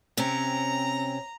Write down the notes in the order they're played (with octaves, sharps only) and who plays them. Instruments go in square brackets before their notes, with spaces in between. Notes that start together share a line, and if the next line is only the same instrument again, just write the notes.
[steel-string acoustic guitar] C3 C4 C#4 [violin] A#5